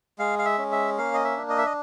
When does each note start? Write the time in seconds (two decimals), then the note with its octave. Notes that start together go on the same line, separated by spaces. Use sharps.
0.19 G#3 F5
0.39 F5
0.45 E5
0.58 C#4
0.72 E5
0.98 A#3 F5
1.14 D#5
1.24 E5
1.37 D4
1.50 D#5
1.58 E5
1.66 D#5